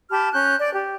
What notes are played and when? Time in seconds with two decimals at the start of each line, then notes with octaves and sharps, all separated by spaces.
0.10 G4 A5 B5 F6
0.33 C#4 F#6 G6
0.58 D5
0.73 G4